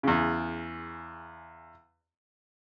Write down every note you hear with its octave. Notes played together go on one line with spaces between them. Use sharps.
E2 C#3